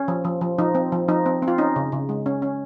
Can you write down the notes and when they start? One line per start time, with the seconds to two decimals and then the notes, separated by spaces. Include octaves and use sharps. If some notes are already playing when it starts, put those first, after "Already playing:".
Already playing: C#4
0.08 F3
0.25 F3
0.41 F3
0.59 F3 D#4
0.75 C4
0.92 F3
1.08 F3 D#4
1.26 C4
1.42 C4
1.48 F4
1.58 C#4 D#4
1.76 C#3
1.92 C#3
2.09 G#3
2.26 C#4
2.42 C#4